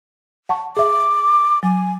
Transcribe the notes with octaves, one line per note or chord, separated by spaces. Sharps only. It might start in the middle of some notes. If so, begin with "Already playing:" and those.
F#5 A5 C#6
G#4 E5 D6
F#3 G#5